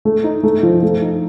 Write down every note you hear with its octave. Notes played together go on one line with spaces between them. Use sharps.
A3
D#4
A3
F3
A3
D#4